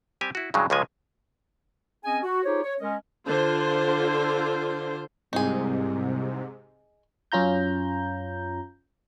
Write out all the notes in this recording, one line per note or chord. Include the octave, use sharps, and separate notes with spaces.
G3 C4 G4 G#5
E4 F#4
G2 C#3 E3 F#3 G#3
C#2 C#3 F3 G3 G#3 G#5
C4 C#4 G#4 D#5 G#5
F#4
D#4 F4 G4 G#4 C5 C#5
C#5
G#3 C#4 A#4 D#5
D3 F4 C5
C2 G#2 C3 D#4 G#4
F#2 C#4 F4 A#5 G6